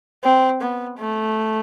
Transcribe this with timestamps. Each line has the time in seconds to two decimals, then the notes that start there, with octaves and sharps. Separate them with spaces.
0.24 C4
0.61 B3
0.98 A3